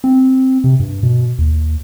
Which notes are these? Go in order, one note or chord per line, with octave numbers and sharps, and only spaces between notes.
C4
C3
G2
B2
D#2